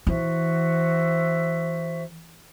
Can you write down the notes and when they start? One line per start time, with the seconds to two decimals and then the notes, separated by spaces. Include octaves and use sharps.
0.07 E3 F#4 C5 E5